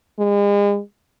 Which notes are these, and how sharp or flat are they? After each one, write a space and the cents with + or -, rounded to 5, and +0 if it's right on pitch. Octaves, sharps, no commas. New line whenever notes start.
G#3 -40